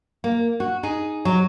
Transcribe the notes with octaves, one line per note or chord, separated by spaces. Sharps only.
A#3
F#4
D#4 G#4
F#3